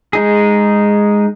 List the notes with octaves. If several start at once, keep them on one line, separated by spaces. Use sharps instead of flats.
G#3 D#4 G#4